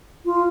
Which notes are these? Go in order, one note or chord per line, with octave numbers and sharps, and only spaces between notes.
F4